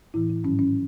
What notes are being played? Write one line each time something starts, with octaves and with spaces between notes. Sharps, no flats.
A2 E3 E4
E4
G#2 D#3 F#3 C#4
C#4